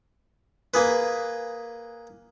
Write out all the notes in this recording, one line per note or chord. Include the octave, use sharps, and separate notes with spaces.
A#3 G#4 B4